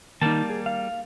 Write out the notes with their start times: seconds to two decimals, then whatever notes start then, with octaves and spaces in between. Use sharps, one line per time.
0.22 D#3 G3 A#3 D#4 A5
0.50 G#4
0.66 F5